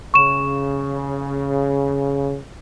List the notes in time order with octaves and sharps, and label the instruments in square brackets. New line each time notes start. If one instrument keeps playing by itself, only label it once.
[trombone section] C#3 [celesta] C#6 E7